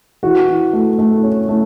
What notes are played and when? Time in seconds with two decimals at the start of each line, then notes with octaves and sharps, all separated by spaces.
0.23 E3 F#4
0.48 E3
0.73 A3
0.99 A3
1.23 C#4
1.49 A3